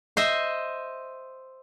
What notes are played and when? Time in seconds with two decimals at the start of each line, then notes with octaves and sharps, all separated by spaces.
0.17 C5 D#5 E5